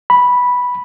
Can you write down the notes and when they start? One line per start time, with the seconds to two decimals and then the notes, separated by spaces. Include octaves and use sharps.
0.10 B5